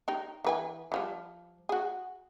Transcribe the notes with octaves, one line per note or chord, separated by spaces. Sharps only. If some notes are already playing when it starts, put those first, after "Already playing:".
D#4 G4
E3 B4 G#5
E3 F3 G3
F#4 G#4